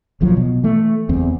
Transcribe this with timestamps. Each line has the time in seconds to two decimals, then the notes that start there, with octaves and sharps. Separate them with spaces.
0.21 D1 A#1 F3 F#3
0.37 B2
0.63 E3 A3
1.09 F#1 E2 C4